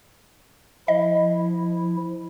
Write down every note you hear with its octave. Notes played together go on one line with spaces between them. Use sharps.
F3 E4 D#5